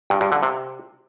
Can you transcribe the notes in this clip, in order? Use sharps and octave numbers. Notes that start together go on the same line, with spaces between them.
G2
G2
D3
C3